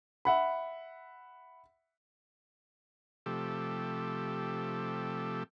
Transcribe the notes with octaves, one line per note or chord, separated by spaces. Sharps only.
E5 F#5 B5
C3 F3 A3 G4 A4